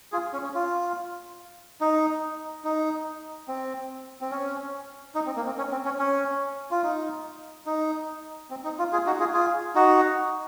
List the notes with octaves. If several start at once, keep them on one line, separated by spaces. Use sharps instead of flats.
F4 G#4
C#4
C#4
F4
D#4
D#4
C4
C4
C#4
D#4
C4
A#3
C4
C#4
C4
C#4
C#4
F4
D#4
D#4
C4
D#4
F4
F4 G#4
D#4 F#4
F4 G#4
F4 G#4
D#4 F#4